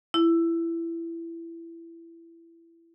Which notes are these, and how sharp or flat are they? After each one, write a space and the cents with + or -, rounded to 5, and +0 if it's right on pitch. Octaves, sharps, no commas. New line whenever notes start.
E4 +20